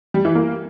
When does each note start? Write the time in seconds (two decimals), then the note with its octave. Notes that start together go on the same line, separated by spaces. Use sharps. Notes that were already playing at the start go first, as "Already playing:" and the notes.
0.14 G3
0.25 E3
0.35 A#3